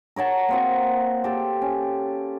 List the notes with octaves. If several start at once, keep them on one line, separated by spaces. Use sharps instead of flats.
A#4 C#5 F#5 A5
A#3 C4 F#4
G4 A4
C#4